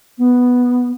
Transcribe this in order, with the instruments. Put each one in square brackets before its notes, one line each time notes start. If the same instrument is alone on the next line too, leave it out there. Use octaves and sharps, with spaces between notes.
[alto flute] B3